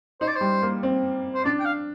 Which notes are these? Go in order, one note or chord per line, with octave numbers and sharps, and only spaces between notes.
D#4 C5
D5
C5
G3
A#3
C4
C5
D4 D5
G5
F5